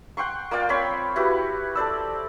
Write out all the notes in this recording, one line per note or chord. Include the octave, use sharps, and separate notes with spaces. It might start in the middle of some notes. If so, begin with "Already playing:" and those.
F#5 G5 C6 C#6
A#3 F4 D5 G5
C4 C#5 B5 C6
E4 F#4 G4 B4
A4 C5 D5 E6